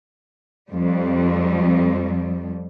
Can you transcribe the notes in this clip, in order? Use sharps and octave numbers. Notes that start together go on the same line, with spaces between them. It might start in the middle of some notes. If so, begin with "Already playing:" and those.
F2 G3